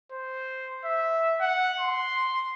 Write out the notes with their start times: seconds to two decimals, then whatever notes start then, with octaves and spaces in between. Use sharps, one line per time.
0.12 C5
0.85 E5
1.41 F#5
1.80 C6